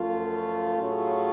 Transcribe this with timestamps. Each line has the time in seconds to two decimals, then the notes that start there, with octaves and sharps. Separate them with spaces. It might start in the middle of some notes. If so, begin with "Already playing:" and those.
Already playing: F#2 F3 A3 F4
0.78 A2 F#3 C#4 F4 G#4